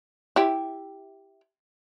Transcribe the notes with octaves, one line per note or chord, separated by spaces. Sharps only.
E4 G4